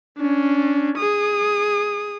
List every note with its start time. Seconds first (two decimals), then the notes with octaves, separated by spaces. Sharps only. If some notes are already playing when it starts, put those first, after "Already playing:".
0.18 C#4 D4
0.98 G#4 D#6